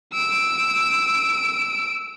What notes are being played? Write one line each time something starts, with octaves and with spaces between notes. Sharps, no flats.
E6 D7